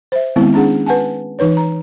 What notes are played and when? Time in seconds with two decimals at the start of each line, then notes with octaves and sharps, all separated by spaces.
0.12 C5 E5
0.36 D#3 G#3 B3 C4 E4
0.54 C#4 D4 G#4 F#5
0.86 B4 F#5 G#5 A5
1.39 E3 D#4 B4 C#5
1.57 A#5